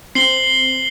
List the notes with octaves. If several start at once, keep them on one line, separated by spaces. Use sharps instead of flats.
C4 C7 F#7 G7